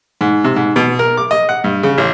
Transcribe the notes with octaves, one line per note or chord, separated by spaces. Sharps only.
G#2
C3
G#2
B2
A#4
D6
D#5
F#5
G2
C#3
A1